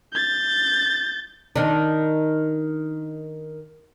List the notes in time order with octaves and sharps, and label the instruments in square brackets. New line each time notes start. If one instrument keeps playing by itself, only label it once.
[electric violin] G6 A6
[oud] D#3 D4